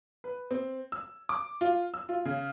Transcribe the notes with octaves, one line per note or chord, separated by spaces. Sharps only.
B4
C4
E6
D6
F4
E6
F4
C#3